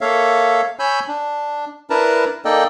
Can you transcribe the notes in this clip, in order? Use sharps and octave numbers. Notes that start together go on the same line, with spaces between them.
A#3 A4 C#5 E5 F5
C#5 G#5 B5 E6 G6
D4
D4 E4 A#4 B4 A5 A#5
A#3 D#4 A4 D5 D#5 G5